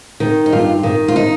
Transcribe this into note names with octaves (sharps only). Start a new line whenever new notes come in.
D#3
D#4
G2 F4
D#3
F4
D#4